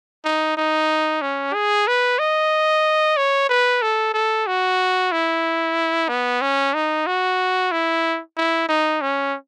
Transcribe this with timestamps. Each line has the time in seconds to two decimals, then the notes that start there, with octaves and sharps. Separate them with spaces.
0.25 D#4
0.57 D#4
1.22 C#4
1.54 G#4
1.87 B4
2.19 D#5
3.17 C#5
3.49 B4
3.82 A4
4.14 A4
4.47 F#4
5.12 E4
6.09 B3
6.41 C#4
6.74 D#4
7.07 F#4
7.72 E4
8.37 E4
8.69 D#4
9.02 C#4